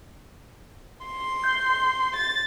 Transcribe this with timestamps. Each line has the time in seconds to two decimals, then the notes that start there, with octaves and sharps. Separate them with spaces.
1.06 C6
1.44 G6
2.16 A6